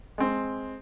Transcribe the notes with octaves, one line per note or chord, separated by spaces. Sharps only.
G#3 C4